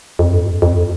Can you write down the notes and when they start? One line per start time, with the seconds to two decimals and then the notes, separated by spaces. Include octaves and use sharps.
0.19 F2
0.33 G2
0.62 F2